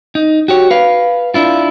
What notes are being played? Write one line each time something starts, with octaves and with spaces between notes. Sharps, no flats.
D#4
F#4 G4 C#5
B4 F5
D4 E4 F4